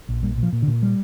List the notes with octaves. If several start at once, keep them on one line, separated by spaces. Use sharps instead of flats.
A#1
A#2 G3
A#2
F3
A#2
D3
A#2
G3